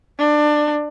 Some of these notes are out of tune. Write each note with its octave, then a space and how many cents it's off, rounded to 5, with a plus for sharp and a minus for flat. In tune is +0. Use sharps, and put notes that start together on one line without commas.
D4 +20